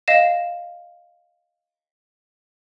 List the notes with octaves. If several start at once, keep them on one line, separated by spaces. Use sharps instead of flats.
D#5 F5 A#6 E7